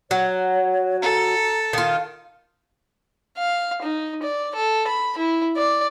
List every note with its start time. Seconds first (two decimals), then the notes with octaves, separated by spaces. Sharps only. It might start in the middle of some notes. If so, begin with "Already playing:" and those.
0.11 F#3 C#5
1.02 A4 A#5
1.73 D#3 F4 F5
3.38 F5
3.83 D#4
4.23 D5
4.56 A4
4.87 B5
5.18 E4
5.57 D5